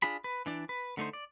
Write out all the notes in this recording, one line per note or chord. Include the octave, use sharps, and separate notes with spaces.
D4 F4 G#4 B5
B4
E3 D4 D5
B4
D3 A3 D#4 C5
D5